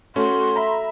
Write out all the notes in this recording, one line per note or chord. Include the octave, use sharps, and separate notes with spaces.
A3 C#4 F#4 C6
E5 A#5 B5